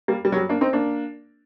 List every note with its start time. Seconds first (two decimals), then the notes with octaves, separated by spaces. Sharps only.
0.08 G3 A#3
0.25 G3
0.32 F#3
0.37 G3
0.49 A#3 D4
0.61 C4 D#4
0.73 A#3 D4